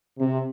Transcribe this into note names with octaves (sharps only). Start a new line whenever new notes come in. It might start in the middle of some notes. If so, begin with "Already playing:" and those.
C3